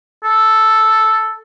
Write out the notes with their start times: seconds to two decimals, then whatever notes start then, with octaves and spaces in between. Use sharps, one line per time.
0.24 A4